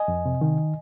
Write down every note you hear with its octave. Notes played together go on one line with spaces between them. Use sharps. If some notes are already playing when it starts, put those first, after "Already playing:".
Already playing: D#5 G#5
F2
C3
D#3